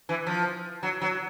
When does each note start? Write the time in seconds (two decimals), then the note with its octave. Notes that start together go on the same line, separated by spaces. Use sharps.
0.09 E3
0.27 F3
0.83 F#3
1.02 F#3